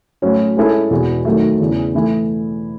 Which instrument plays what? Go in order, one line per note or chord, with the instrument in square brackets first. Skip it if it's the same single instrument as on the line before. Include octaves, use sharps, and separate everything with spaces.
[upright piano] A2 F#3 C#4 F#4
G#3 C#4 E4 A4
E2 B2 G#3 B3 F#4
D#3 F#3 A3
E2 C#3 E3
E3 A3 E4